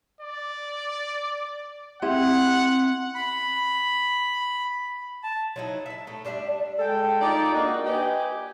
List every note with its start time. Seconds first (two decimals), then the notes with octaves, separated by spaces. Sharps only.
0.21 D5
2.02 C4 E4 G4 F#5
3.15 B5
5.23 A5
5.56 F#3 D#4 E4
5.86 E5 A5
6.07 A2 A3 D#4
6.25 G3 D4 F4 E5
6.79 G#3 A4 G5
7.21 D#4 F4 G4 D5
7.54 A#3 D4 D#4 F#4
7.85 G4 B4 D5 D#5 G5 G#5